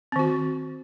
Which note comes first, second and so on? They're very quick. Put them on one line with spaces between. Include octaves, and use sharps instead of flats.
C4 D#3 F#4